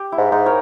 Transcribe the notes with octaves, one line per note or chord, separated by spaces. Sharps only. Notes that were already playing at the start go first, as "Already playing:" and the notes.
Already playing: G4
E4
G#2
G#2 D#4
A#4 C#5